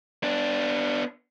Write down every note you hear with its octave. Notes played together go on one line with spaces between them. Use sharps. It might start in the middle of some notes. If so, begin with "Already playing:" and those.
B3 D4